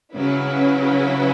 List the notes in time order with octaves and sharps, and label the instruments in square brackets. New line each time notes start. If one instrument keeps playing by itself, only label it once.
[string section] C#3 F#3 C#4 E4 B4